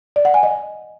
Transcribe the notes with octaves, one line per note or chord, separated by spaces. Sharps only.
D5
F#5
G#5
D#5